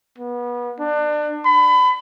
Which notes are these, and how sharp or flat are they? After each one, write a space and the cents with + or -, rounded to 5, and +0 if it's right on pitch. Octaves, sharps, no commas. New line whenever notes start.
B3 -30
D4 +30
B5 +30